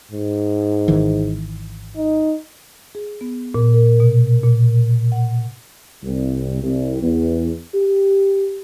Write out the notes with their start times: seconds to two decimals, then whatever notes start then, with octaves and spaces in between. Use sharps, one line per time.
0.12 G#2
0.88 G#1 D#3 E3
1.97 D#4
2.95 G#4
3.21 B3
3.55 A#2
3.74 A#4
4.00 B2
4.44 A#2
5.12 F#5
6.03 C2
6.62 C2
7.02 E2
7.74 G4